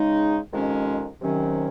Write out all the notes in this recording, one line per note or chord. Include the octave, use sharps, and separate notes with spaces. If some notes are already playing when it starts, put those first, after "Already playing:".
Already playing: C#3 G#3 D#4
F2 C3 D#3 G#3 C#4
C3 D#3 F#3 C#4